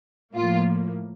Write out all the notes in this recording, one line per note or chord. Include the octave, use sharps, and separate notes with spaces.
A2 F3 A#3 F4